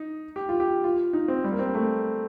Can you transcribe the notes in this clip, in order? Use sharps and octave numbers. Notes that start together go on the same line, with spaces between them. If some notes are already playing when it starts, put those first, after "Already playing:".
Already playing: D#4
G4
F4
G4
F4
D#4
C4
G3
A#3
C4
A3